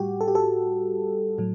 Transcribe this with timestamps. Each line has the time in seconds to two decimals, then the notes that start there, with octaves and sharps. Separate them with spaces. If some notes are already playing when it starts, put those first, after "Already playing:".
Already playing: A2 G3 F#4 G4
0.21 A4
0.28 G4
0.35 A4
1.38 A2 F#3